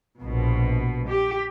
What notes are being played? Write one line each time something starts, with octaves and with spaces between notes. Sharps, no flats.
A#1 B2
G4